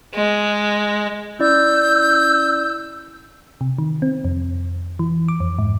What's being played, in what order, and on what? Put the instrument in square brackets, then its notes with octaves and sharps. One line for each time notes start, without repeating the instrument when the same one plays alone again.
[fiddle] G#3
[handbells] C#4 E4 D5 [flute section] E6 G6
[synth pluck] C3
D#3
C4
F2
E3
D6
F2
G#2